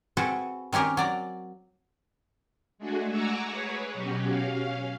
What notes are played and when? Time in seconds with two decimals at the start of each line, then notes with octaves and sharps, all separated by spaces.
0.17 C4 F#4 G#4 A4 B4 F#5
0.73 D#3 C4 C#4 G4 A#4
0.97 F#3 D5 A#5
2.78 G#3 A3 D4 F#4 G#4
3.11 F#5 G#5 A#5 C#6 D6 E6
3.50 G#4 B4 C#5
3.94 B2 F#3 C#4 F#4 G4
4.28 C#4 F5